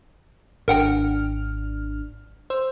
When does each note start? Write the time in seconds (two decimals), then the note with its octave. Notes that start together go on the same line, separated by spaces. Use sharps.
0.68 G#1 D4 A#4 F#5 G5 F6
2.50 C5 E6